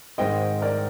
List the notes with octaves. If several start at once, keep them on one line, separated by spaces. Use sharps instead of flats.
G#2 D#3 G#3 C4 D#5 G5
A#4 D5